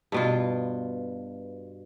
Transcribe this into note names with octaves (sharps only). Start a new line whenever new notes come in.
G2 B2 F4